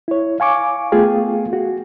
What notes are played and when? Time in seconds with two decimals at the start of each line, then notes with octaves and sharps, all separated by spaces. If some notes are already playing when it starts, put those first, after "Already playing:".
0.08 E4 C#5
0.40 F5 G#5 C#6 D6
0.92 A3 B3 F4 G#4 F5 G5
1.53 F#4